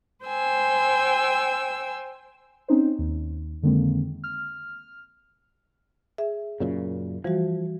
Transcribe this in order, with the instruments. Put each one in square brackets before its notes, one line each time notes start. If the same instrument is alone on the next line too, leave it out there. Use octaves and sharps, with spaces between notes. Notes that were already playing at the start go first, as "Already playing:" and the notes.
[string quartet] C5 G5 G#5 E6
[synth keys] C4 C#4 D#4 C5
D#2
F2 D3 D#3 G#3 A#3 C4
F6
[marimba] G#4 E5
[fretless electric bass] F#2 A#2 C#3
[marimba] E3 G3 F#4 [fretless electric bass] F3